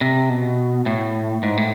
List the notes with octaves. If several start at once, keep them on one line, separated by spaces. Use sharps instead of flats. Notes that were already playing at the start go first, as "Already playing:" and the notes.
C3
B2
A2
G#2
A2